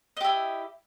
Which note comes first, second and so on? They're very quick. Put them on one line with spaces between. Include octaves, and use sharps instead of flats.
D#5 G4 E4